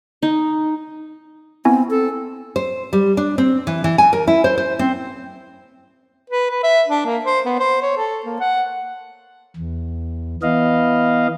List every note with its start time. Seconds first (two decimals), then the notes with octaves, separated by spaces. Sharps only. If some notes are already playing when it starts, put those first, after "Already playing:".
0.22 D#4
1.65 B3 C4 E4 G#5
1.91 C4 A4
2.56 C5
2.93 G3
3.17 D4
3.38 C4
3.67 E3
3.84 E3
3.98 G#5
4.13 A#4
4.27 E4
4.44 C5
4.58 C5
4.79 C4
6.30 B4
6.50 B4
6.63 E5
6.88 D4
7.06 A#3
7.25 C5
7.46 B3
7.59 C5
7.82 C#5
7.97 A4
8.26 A#3
8.40 F#5
9.57 E2
10.42 E3 B3 D#5 F5